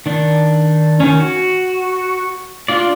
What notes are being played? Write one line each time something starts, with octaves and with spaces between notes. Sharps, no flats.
D#3 D4
D#3 C#4
F#4
D4 F4 D5